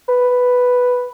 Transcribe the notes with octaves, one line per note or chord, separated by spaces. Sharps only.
B4